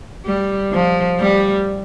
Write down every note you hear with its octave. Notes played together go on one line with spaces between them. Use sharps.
G3
F3
G3